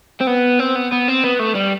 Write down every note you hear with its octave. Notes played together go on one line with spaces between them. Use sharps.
C4
B3
C4
B3
B3
C4
B3
A3
G3